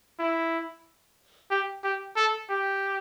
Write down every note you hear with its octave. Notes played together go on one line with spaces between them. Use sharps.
E4
G4
G4
A4
G4